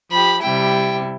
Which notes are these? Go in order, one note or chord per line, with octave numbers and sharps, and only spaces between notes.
F3 G4 B5
C3 G3 E4 G5